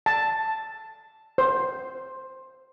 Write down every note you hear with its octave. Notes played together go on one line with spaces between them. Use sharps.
A5
C5